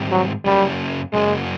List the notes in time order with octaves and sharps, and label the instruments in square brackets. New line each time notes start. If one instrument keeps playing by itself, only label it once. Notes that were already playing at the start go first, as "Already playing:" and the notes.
Already playing: [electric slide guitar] G#2 D#3 G3 C4
[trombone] F#3
[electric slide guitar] F#2 C#3 F#3 A#3 C#4 [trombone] G3
[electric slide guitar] F#2 C#3 F#3 A#3 C#4 [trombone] G#3